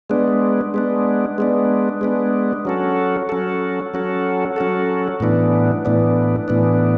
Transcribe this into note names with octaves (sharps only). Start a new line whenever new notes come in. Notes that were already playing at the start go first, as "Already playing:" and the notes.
G#3 B3 D4
G#3 B3 D4
G#3 B3 D4
G#3 B3 D4
F#3 C#4 F#4 A4
F#3 C#4 F#4 A4
F#3 C#4 F#4 A4
F#3 C#4 F#4 A4
A2 E3 B3 D4
A2 E3 B3 D4
A2 E3 B3 D4